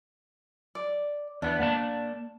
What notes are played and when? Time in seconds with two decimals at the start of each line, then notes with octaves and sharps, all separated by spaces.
0.75 D5
1.42 E2 B3 D4
1.60 A#3 D5 A5